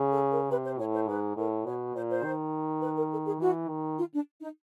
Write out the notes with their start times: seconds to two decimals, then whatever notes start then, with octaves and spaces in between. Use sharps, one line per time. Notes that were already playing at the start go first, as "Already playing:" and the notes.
Already playing: C#3
0.11 A4
0.31 A#4
0.50 C3 B4
0.64 C5
0.79 A2 C#5
0.94 C5
1.08 G#2 B4
1.36 A2 A#4
1.65 B2 C#5
1.95 A#2 C5
2.09 C5
2.24 D#3
2.81 B4
2.96 A#4
3.11 A4
3.25 G#4
3.40 E3 F#4
3.68 D#3
3.98 F4
4.12 D4
4.41 D#4